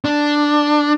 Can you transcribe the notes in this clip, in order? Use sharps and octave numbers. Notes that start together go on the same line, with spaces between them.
D4